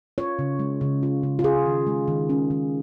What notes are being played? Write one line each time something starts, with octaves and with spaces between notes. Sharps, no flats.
F4 C#5
C#3
G#3
C#3
F4
C#3
F4
C#4 G#4
D#3
G#3
D#3
C#4
D#3